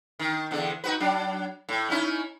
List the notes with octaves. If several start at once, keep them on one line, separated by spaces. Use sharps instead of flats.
D#3
E2 D3
D#4 F#4 B4
F#3 D4
A2
C#4 D#4 E4